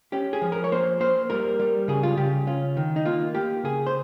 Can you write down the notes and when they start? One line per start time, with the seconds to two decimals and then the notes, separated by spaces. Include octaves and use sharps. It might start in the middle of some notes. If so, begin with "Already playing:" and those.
0.12 C#4 G4
0.33 G#4
0.42 F3
0.52 A#4
0.64 C#5
0.72 A#3 C5
1.00 A#3 C5
1.30 G3 A#4
1.60 G3
1.88 C#3 G#4
2.03 F4
2.17 C#3 G4
2.47 C#4 F4
2.77 D#3
2.96 D#4
3.05 A#3 F4
3.35 A#3 G4
3.64 C#3 G#4
3.87 C5